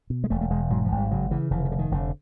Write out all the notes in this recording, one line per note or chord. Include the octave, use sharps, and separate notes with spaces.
B2
G#3
E1 A3
A3
E1 G#3
G#2 F#3
F3
G#1
G3
C#3 F#3
C#3 E3
F1 E3
E3
D3
D#3
F1 D3